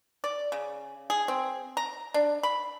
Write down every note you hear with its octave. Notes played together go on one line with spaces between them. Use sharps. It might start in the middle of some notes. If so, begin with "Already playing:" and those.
D5
C#3
G#4
C4
A#5
D4
B5